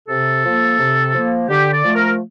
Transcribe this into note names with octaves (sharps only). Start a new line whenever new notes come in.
C3 A4
F3 A#3
C3
F3 A#3
D3 G4
D5
F3 A3
A#4